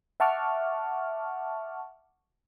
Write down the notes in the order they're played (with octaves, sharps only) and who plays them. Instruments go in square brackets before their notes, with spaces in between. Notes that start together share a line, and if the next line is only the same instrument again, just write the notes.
[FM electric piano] E5 F#5 A5 C#6 D6 F6